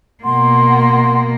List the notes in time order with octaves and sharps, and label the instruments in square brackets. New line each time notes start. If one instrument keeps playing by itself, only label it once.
[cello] B2 A#3 [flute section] F#5 C6